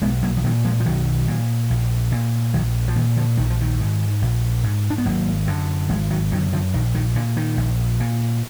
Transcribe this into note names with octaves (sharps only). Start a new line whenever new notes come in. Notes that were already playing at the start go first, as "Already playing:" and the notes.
B1 G#3 B3
F#3 A#3
F3
A#2 D#3 F#3
F3 G#3
F3
B1 D#3 F#3
A#2
A#1
A#2
A#1 D#3 F#3
F3
A#2 D#3
D3 F3
A#1 D#3
F3
D#3
G#2
A#1
G#2
D4
B3
G#1 F#3 A#3
F#2 D3
G#1 F3 G#3
D#3 F#3
F#2 D3 D#3 F#3
D3 F3
A#1 D#3
D#3
A#2 D3
D#3
A#1
A#2